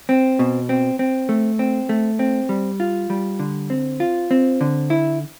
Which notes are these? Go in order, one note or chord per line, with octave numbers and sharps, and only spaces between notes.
C4
B2
C4
C4
A3
C4
A3
C4
G3
F4
G3
D3
C4
F4
C4
D3
E4